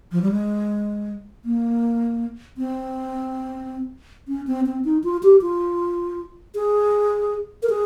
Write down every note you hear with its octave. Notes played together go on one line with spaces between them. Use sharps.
F3
G3
G#3
A#3
C4
C#4
C4
C4
D#4
F4
G4
F4
G#4
A#4
G#4